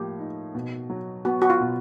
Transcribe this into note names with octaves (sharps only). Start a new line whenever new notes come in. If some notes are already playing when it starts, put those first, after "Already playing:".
Already playing: A2 F3 A#3 G4
D#4
B2
F#3
B3 F#4
F#4
F4
B2